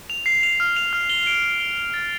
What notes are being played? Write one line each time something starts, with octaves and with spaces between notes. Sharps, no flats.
F7
C7
F7
F6
F7
F6
G7
D7
G7
G7
F7
A6